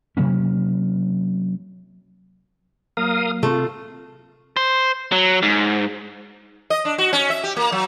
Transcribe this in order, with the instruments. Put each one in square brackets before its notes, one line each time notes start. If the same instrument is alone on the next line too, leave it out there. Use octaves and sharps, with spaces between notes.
[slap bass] C3 F#3 A#3 C#4
[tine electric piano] F#3 A#3 [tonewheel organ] A#4 F5 D#6
[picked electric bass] C3 C4 [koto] A3 [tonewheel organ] F4
[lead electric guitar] C5
F#3
G#2
[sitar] D#5
D4
F#4
C#4
E5
G4
A#3
F#3